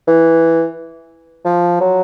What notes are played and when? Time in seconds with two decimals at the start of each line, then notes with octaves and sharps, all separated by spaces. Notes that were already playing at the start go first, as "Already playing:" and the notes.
0.08 E3
1.45 F3
1.81 F#3